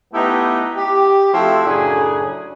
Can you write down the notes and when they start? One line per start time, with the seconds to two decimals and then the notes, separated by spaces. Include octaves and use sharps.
0.13 A3 B3 D#4 E4 G4 B4
0.75 G4
1.32 F3 A3 C4 E4 F#4 G4
1.66 F#2 A2 C#3 D4 G#4 G#5